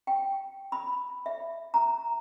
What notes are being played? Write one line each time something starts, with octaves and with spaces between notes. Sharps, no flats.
G5
B5
E5
A#5